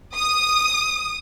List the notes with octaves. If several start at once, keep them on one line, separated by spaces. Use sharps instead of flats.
D#6